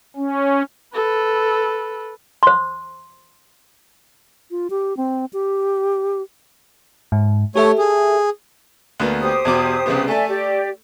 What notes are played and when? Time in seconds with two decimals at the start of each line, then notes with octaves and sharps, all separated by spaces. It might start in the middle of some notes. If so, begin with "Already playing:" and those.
0.16 C#4
0.94 A4 B4
2.43 C5 C6
4.51 F4
4.70 G4
4.97 C4
5.33 G4
7.12 G#2
7.56 A3 G4 A4 C#5 E5
7.78 G#4
9.00 D2 A#3 B3
9.21 G4 C5 D#6
9.45 E2 B2 D6
9.86 C2 C#3 B3
10.08 A3 A4 D5 E5 G#5
10.29 G4 D5